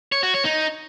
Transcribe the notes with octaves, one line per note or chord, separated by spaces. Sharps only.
C#5
F#4
C#5
D#4